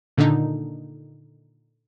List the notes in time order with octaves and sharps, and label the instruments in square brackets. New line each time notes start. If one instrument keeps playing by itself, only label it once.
[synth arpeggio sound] A#2 D3 D#3 D4 D#4